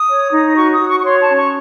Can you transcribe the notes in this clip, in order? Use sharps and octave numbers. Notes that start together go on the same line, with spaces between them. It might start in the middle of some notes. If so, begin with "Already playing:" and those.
Already playing: D#6
C#5
D#4
F#4 C#6
D#6
F#4
C#6
C#6
C#5 C6
A5
C#4
C#6